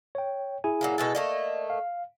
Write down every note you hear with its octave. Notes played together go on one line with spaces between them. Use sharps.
C#5 G5
E4 G#4 G#5
A#2 F#3 A#3
B2 G#3 A4
A3 A#3 D5 D#5
F5